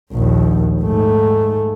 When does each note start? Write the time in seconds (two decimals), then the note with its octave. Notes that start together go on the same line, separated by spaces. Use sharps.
0.13 A#1 D#2
0.82 G#2 A3